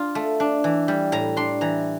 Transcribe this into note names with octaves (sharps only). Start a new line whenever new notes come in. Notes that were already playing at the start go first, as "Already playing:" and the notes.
Already playing: D4 F4
A3
D4
E3
G3
A2 A#5
D4 C6
E3 A#5